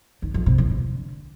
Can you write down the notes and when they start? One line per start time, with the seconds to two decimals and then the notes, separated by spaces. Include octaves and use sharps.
0.22 D#3
0.34 F2
0.46 C3
0.58 E3
0.70 D3